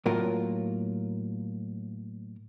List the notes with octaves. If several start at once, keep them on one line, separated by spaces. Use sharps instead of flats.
A2 F#3 A#3 F4 A#4